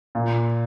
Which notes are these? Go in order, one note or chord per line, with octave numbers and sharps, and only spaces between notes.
A#2